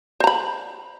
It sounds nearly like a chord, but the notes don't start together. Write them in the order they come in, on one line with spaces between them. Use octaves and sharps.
C5 A#5 B5